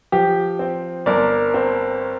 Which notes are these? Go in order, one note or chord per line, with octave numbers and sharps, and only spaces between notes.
F3 G4
C4
G1 A#4 D5
C4